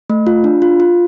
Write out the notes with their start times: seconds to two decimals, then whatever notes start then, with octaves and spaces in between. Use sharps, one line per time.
0.10 A3
0.27 F4
0.44 D4
0.62 F4
0.80 F4